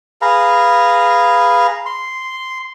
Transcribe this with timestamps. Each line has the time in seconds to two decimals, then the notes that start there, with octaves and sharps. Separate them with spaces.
0.22 G#4 B4 F5 A#5
1.86 C6